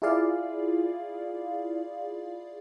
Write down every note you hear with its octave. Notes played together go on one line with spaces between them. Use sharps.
E4 F4 G#4 D5 F5